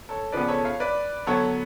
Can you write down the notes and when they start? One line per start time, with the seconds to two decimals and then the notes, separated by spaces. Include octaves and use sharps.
0.09 A4 C#5
0.32 C#3 F3 B3 B4 D5
0.48 A4 C#5
0.64 C#5 F5
0.80 B4 D5
1.27 D3 F#3 B3 A4 C#5